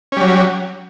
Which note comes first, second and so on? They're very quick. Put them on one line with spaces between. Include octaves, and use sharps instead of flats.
C#4 G3 F#3